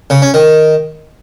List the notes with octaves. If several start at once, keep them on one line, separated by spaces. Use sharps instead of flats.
C#3
C#4
D#3